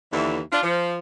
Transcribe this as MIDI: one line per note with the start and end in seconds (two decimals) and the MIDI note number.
0.11 0.39 39
0.11 0.39 50
0.11 0.39 52
0.51 0.60 62
0.51 0.60 65
0.63 0.96 53